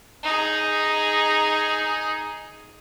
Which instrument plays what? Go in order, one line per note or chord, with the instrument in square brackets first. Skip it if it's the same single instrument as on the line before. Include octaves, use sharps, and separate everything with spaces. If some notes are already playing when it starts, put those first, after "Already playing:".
[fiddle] D#4 G#4